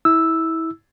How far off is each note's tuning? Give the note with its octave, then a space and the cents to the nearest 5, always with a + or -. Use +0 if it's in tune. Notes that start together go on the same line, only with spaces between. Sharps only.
E4 -25 E6 +0